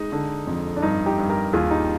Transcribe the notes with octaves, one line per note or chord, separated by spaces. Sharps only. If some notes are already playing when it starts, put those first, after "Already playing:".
Already playing: G#3 D#4
D3
F2
D4
G2 D#4
D#4 G4
G2
G4 A#4
D#2 F4 G#4
D#4 G4